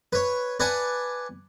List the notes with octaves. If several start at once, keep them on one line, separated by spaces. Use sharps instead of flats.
B4 C#5
B4 D5 F#5 G#5 A5